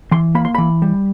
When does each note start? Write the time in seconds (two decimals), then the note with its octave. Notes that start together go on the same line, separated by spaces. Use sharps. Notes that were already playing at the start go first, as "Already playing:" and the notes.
0.11 E3 C6
0.35 A#3 B5
0.45 C6
0.55 E3 B5
0.82 G3